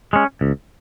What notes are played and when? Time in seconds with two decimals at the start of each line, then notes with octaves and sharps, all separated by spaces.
0.13 G#3 C#4
0.41 C#2